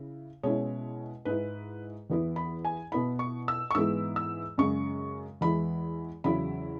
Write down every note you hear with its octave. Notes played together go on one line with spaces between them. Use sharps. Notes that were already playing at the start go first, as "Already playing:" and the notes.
Already playing: C#3 E4
B2 G#3 C#4 E4 C#5
G#2 G#3 E4 B4
E2 E3 B3 E4
B5
G#5
B2 B3 E4 B5
C#6
E6
C#6
G#2 E3 G#3 B3 E4 E6
E6
F#2 C#3 G#3 C#6
E2 E3 G#3 E4 B5
E2 C#3 F#3 E4 B5